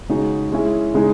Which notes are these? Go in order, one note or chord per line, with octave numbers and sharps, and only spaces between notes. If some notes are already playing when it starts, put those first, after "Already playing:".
C#3 G#3 D#4 F#4
G#3 C#4 E4 G#4
C#3 G#3 D#4 G#4